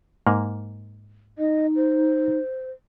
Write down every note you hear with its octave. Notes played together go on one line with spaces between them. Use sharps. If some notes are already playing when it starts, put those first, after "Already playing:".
G#2 A#3
D#4 D#5
C5